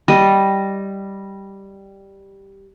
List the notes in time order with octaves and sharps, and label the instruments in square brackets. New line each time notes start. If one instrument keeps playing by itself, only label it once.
[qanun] G3 D#5